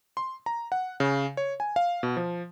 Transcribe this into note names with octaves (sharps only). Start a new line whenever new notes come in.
C6
A#5
F#5
C#3
C#5
G#5
F5
B2
F3